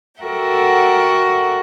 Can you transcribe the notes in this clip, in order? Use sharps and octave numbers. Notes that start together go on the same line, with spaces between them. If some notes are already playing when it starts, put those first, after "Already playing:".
F#4 A4 A#4 E5 F#5 G5